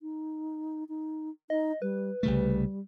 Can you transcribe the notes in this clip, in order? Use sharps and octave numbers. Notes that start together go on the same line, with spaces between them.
D#4
D#4
D#4 D#5
G3 B4
C2 C#3 G3 A3